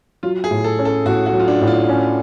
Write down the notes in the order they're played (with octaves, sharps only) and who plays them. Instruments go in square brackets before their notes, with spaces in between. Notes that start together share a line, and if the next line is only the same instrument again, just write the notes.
[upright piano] F#3 [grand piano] F4
[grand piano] G#4
[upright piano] A2
[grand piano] A4
[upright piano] C#4
[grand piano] A4
[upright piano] A2 [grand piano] F#4
[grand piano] F#4
[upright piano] F#3
[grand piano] F4
D4
[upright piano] A2
[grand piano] F4
[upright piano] C#4